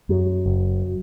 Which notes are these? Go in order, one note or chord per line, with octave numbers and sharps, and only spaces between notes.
F#2 F#3
F#1